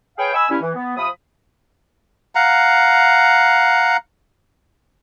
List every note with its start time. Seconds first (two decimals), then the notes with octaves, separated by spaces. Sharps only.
0.18 G#4 B4 C#5 F5 G5
0.34 D#5 G#5 B5 E6
0.50 G2 C#4 E4
0.62 E3
0.75 B3
0.97 C3 F3 B5 D#6
2.35 F5 F#5 A#5